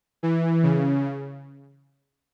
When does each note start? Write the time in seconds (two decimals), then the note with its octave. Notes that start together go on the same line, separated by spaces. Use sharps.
0.23 E3
0.63 C#3